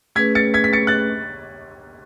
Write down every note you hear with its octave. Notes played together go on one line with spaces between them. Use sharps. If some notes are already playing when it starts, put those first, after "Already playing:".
A3 C#4 G#4 B4 G#6 B6
A6 C#7
G#6 B6
B6
A6 C#7
F#6 A6